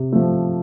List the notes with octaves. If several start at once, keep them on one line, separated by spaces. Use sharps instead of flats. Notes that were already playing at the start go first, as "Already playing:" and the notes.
Already playing: C3
F3 A3